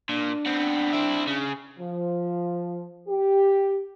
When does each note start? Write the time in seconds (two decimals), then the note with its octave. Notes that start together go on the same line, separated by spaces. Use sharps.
0.09 A#2 D4
0.46 B3 C4
0.93 C4 E4
1.27 C#3
1.80 F3
3.08 G4